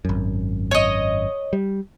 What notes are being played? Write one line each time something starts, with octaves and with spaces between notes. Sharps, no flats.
G#1 F#2
C#5 D#5
G3